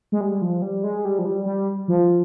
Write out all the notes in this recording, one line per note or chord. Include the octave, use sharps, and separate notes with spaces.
G#3
G3
F3
G3
G#3
G3
F3
G3
G3
F3